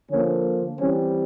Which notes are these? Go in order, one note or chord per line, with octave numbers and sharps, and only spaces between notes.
D3 F3 A#3 C#4
E3 G3 C4 C#4